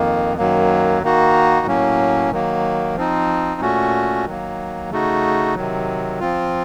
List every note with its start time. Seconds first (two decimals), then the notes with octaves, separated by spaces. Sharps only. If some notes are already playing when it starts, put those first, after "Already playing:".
Already playing: F2 D#3 A#3
0.37 F#2 D#3 F#3 A#3
1.02 D#3 A#3 D#4 F#4
1.67 A2 F#3 A#3 C#4
2.31 D#3 F#3 A#3
2.96 F3 C4 D#4
3.61 A#2 A3 C#4 F#4
4.26 D#3 F#3 A#3
4.90 C#3 A3 D#4 F#4
5.55 C3 D#3 F#3
6.20 F3 C4 F4